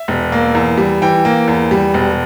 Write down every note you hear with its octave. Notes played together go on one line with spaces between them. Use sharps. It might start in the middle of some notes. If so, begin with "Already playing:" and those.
Already playing: E5
E1
A#3
E2
G3
E3 G5
A#3
E2
G3
E1